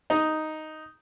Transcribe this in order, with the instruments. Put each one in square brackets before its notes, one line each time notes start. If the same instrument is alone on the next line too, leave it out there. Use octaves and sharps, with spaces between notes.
[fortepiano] D#4